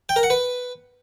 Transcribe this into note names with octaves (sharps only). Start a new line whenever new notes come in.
G5
A#4
F#5
B4